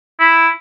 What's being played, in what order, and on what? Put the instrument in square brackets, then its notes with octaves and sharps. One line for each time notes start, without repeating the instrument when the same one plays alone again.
[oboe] E4